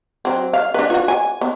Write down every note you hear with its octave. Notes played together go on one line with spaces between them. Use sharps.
F#3 C4
F5
D4 B4
F4 F#4
G#5
B3